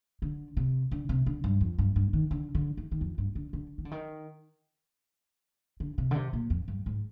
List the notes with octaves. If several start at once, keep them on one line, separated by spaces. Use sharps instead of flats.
D3
C3
D3
C3
D3
G2
F2
G2
G2
D#3
D3
D3
D#3
D#3
F2
G2
D3
D3
D#3
D3
D#3
D3
C3
D3
C3
A#2
F2
G2
G#2